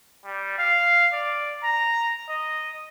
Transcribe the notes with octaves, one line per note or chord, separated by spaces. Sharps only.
G3
F5
D5
A#5
D#5